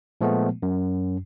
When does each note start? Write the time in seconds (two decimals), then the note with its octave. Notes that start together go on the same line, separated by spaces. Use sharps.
0.21 A#2 F3 G#3 A3 B3
0.63 F#2